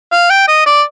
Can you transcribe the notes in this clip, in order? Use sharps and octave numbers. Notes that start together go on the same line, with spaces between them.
F5
G5
D#5
D5